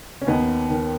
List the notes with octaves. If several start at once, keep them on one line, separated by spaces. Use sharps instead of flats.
C#4
D#2 B3 D#4
D#3